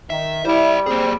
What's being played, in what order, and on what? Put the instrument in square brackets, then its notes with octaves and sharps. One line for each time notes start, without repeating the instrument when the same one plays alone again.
[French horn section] D#3 [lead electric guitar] E5
[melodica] G3 [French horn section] E4 [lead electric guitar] C5 D5
[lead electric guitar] A#3 G#4 [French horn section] C4